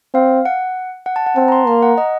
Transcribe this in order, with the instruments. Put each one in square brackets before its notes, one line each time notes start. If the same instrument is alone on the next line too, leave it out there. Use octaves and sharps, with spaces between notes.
[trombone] C4 [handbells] F5
[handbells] F#5
F#5
A5
F#5
[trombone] C4 [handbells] A5
[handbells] A#5
C6
[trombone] A#3 [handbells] A#5
[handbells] F#5
D#5